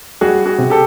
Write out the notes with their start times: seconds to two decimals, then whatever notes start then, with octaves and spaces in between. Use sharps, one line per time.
0.21 G3 F#4 G#4
0.46 F#4 G#4
0.58 C3
0.70 G4 A4